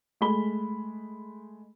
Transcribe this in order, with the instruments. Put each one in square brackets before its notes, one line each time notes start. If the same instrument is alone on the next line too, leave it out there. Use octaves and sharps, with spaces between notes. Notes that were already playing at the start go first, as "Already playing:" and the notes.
[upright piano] G#3 A3 B5 G7